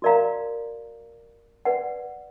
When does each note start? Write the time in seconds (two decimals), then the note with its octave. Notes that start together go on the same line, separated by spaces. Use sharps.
0.02 F#4 A#4 D5 F5 A#5
1.65 B4 D5 F#5